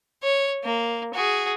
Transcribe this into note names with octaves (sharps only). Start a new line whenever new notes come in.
C#5
A#3
F#4 G#4